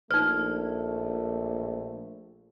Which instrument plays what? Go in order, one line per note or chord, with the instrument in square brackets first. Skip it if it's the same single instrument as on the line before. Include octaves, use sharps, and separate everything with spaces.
[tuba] A#1 [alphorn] A3 [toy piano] D#4 C#5 [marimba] F6